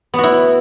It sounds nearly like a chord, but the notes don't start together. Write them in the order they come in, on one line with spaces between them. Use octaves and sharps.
B3 F#4 E4